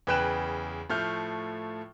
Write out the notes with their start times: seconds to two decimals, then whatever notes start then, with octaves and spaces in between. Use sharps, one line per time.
0.07 E2 C#3 B4 G5 F#6 E7
0.90 A2 F3 A3 F6 G6